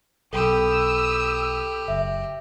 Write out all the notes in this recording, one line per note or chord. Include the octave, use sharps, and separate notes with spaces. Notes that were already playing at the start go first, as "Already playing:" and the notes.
B1 B2 G4 A4 G5 B5 D#6 E6
F#1 E5